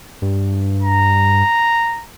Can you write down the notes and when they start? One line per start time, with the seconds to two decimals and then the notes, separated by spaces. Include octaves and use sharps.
0.22 G2
0.83 A#5